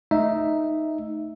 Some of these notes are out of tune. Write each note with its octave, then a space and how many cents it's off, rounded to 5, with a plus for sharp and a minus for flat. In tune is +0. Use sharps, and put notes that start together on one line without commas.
A3 +0 D#4 +0 E5 +0